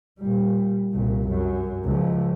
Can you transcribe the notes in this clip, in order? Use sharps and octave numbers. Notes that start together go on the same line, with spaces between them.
A#2 G3
C2 A#2
F#2
C#2 F3